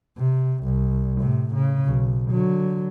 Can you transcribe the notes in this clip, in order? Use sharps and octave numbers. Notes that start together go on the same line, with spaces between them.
C3
C2
A2 C3
C#3
B1
D3 F#3